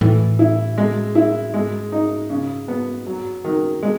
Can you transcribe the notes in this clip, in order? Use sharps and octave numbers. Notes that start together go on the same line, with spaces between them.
A2 E3
E4
G#3
E4
G#2 G#3
D#4
C#3
B3
F#2 F#3
G#2
F#2
D#3
G#3